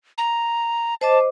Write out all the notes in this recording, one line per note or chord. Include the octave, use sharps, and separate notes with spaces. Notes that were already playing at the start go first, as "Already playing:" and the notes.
A#5
C5 D#5 A5 D6